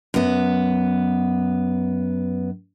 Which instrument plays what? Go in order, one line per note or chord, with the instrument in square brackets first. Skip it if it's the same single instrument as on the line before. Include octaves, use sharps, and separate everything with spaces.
[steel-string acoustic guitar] F#2 B3